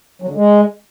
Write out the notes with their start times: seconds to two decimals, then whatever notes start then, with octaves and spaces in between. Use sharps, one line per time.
0.22 F#3
0.28 D3
0.35 G#3